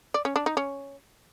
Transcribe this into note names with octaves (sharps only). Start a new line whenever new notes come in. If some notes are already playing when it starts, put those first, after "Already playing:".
D5
C#4
D4
D#4
C#4